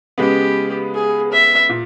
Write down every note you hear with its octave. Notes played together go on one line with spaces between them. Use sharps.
C#3 G#3 B3 G4
G#4
E5
A#2